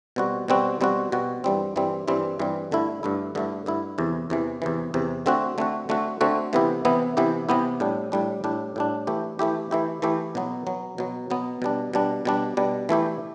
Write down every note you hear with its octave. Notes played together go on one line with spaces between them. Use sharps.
B2 G3 C4 F#4
B2 G3 C4 F#4
B2 G3 C4 F#4
B2 G3 C4 F#4
G2 E3 G3 C4
G2 E3 G3 C4
G2 E3 G3 C4
G2 E3 G3 C4
G2 D3 A3 E4
G2 D3 A3 E4
G2 D3 A3 E4
G2 D3 A3 E4
E2 C3 E3
E2 C3 E3
E2 C3 E3
E2 C3 E3
D3 A3 C4 F#4
D3 A3 C4 F#4
D3 A3 C4 F#4
D3 A3 C4 F#4
C3 E3 B3 E4 G4
C3 E3 B3 E4 G4
C3 E3 B3 E4 G4
C3 E3 B3 E4 G4
A2 G3 D4
A2 G3 D4
A2 G3 D4
A2 G3 D4
E3 A3 E4 G4
E3 A3 E4 G4
E3 A3 E4 G4
E3 A3 E4 G4
B2 F#3 B3
B2 F#3 B3
B2 F#3 B3
B2 F#3 B3
B2 G3 D4
B2 G3 D4
B2 G3 D4
B2 G3 D4
E3 A3 E4 G4